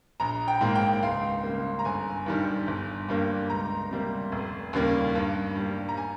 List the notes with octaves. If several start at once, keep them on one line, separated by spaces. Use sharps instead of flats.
A#1 A#5
G5
G#2 D#3 A#3
G5
C#2 F5
C#3 G3 A#3
A#5
G1 G#5
G2 D#3 G3
G1
G2 G3 A#3
C#2 A#5
C3 G3 A#3
F1
D#2 C#3 G3 A#3
G2
G3 A#3
A#5
G#5